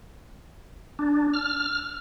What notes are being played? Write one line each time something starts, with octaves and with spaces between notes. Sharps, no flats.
D4
F6